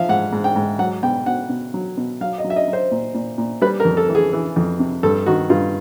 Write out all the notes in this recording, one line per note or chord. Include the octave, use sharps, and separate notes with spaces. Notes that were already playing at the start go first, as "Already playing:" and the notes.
Already playing: F3 E5 F5
G#2 F#5
G#2
G5
G#2
F#3 F#5
B2 G5
B2 F#5
B2
F#3
B2
F#3 F5
D#5
F#3
E5
D#5
F#3
C5
A#2
A#2
A#2
G3 B4
A#4
F2
A4
E3
G#4
E3
F2
C3
G2 A4
D#3 F#4
G2 F4